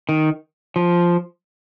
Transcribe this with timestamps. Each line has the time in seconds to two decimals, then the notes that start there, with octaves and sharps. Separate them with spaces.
0.09 D#3
0.76 F3